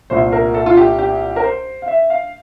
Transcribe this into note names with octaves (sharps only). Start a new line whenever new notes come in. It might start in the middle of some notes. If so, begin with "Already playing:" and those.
C2 A#2 A3 C5
A#4
A4
F4
G4
G4
A#4
C5
F5
E5
F5